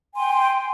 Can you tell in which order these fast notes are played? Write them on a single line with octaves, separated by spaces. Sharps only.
G#5 C6 G5